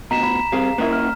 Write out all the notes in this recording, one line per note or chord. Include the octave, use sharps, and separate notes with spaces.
D2 B2 D#5 A#5 B6 E7
B5
G3 C4 G#4 F5
A#3 C#4 E4 A#4 B4 D#5
F6